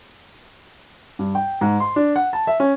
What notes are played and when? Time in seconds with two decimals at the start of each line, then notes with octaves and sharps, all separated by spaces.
1.19 G2
1.35 G5
1.61 G#2
1.80 C6
1.96 D4
2.16 F#5
2.33 A5
2.47 E5
2.60 C#4